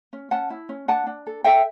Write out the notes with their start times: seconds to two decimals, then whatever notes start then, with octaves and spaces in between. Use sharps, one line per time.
0.13 C#4
0.31 C#4 F#5 A5
0.50 E4
0.69 C#4
0.88 D4 F#5 A5
1.07 D4
1.27 A4
1.44 A4 E5 G5